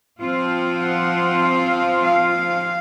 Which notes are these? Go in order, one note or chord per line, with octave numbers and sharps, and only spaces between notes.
F3 C4 F4
F#5
F5
F5